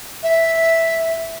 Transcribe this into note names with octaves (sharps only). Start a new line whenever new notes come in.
E5